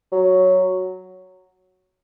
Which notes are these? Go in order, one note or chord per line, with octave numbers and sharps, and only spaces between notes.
F#3